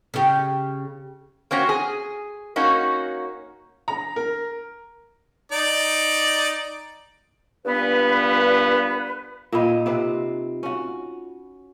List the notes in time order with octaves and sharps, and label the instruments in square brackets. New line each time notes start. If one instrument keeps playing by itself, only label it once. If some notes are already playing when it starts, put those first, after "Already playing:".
[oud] C#3 G4
[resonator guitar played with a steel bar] A#3 C4 C#4 F#4
G#4
A#3 C#4 D#4 F#4
[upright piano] A#5
A#4
[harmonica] D#4 D5
[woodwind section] G2 A#2 B3 B4
[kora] A#2 C4 D#4 [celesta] F4 B5
[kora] C3 C4 B4
C#4 F#4